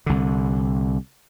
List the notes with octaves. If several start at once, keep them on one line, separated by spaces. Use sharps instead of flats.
C2 D3